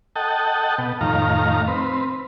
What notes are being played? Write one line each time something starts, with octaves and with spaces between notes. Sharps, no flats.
A4 D#5 F#5 G5 A5
B2
F2 A2 D#3 F5 A#5
C4 B4